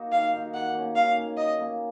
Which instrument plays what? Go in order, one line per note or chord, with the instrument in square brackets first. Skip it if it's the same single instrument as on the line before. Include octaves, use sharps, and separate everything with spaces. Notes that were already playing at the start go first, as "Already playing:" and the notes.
Already playing: [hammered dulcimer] A#3 D#4 F#4
[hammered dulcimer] D#3 [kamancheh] F5
[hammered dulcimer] A#3 D#4 F#4
[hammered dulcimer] D#3 [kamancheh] F#5
[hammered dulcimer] A#3 C#4
[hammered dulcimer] D#3 [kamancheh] F5
[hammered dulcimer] A#3 C#4
[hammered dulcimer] D#3 [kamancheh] D#5
[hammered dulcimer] A#3 C#4